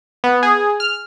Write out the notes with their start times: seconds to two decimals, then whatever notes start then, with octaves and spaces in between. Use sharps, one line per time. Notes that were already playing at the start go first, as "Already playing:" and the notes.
0.24 B3
0.43 G#4
0.80 F6